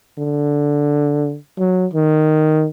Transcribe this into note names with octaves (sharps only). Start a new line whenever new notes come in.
D3
F#3
D#3